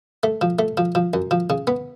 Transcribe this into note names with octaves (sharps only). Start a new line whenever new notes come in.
A3
F3
A3
F3
F3
F#2
F3
C#3
B3